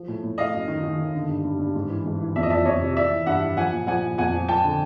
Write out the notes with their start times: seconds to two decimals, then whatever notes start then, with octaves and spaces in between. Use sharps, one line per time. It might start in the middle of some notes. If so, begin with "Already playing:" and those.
Already playing: F3
0.08 A2
0.23 A2
0.38 A2 D#5 F5
0.53 F#2
0.68 D#3
0.83 D#3
0.98 D#3
1.14 D3
1.29 G2
1.44 G2
1.59 G2
1.75 G#2
1.90 E3
2.05 G#2
2.20 E3
2.36 F2 E5
2.43 D#5
2.50 F2 D5 E5
2.65 F2 C#5 D#5
2.82 C3
2.96 E3 D5 E5
3.11 E3
3.26 G2 E5 F#5
3.41 E3
3.56 F3 F#5 G#5
3.72 A#2
3.87 F3 F#5 G#5
4.03 A#2
4.18 F2 F#5 G#5
4.34 F3
4.48 F3 G5 A5
4.64 D3